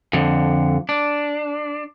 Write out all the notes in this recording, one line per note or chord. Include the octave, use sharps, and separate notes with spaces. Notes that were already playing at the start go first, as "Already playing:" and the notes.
F2 D3
D4